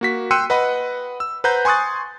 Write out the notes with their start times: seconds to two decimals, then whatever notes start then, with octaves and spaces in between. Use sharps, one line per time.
0.01 A#3 F#4 B6
0.31 G5 C6 E6 F#6 C#7 D#7
0.50 B4 D#5 F#5 B5
1.20 E6
1.44 B4 C5 F#5 A#5 G6
1.65 G#5 C6 C#6 D#6 F#6 A6